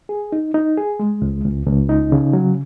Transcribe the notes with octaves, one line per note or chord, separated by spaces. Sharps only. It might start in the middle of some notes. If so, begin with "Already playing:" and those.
G#4
D#4
D#4
G#4
G#3
C#2
C#2
C#2
D#4
C#3
F#3